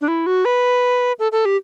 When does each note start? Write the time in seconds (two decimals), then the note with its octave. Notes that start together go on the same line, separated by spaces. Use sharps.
0.01 D4
0.08 E4
0.26 F#4
0.45 B4
1.19 A4
1.32 A4
1.45 G4